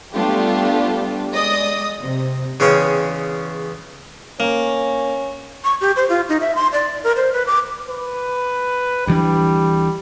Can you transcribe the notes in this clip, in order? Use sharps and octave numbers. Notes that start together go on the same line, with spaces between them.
G3 A3 B3 D4 F4 G4
G#3 D5 D#5 D#6
C3
E2 C#3 G#3 C#4 G5
A#3 C#4
C#6
G4
C5
F4
D#4
E5
C6
D5
A#4
C5
B4
D6
B4
D2 E3 G3 D4